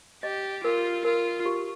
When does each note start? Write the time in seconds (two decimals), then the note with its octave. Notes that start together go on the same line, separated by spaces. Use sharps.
0.23 G4 D#5
0.64 F4 A#4
1.05 F4 A#4
1.45 G4